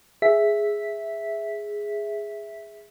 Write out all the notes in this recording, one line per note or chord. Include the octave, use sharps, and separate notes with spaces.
G#4 E5 B6